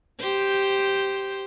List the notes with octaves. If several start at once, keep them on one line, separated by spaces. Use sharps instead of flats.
G4 C5